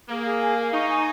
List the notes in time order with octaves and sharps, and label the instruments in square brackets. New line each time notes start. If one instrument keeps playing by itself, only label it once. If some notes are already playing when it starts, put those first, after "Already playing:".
[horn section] A#3 [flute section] G#4
[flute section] G#4
G#5
F5
[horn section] D#4 [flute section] C#6
[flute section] G#5